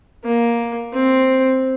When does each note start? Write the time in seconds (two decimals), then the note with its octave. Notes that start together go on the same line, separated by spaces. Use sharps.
0.25 A#3
0.93 C4